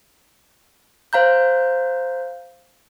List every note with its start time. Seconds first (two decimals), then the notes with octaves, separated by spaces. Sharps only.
1.13 C5 F5 A#5 G6